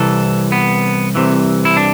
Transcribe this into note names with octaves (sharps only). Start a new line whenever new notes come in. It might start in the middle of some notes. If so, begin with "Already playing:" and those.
Already playing: C2 C3 E3 A4
B3
C2 C3 E3
E4
D4